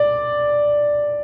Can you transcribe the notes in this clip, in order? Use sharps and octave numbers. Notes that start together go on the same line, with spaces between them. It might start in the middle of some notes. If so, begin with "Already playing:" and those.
Already playing: D5